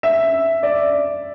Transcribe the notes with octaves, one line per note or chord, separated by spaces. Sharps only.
E5
D5